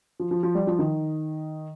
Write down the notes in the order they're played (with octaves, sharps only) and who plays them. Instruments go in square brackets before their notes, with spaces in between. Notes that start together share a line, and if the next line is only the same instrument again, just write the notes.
[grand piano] F3
F3
F3
G3
F3
D#3